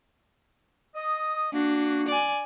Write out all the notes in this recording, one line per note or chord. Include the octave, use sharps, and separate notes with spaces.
D#5 D#6
A#3 D4 F#4
D5 G#5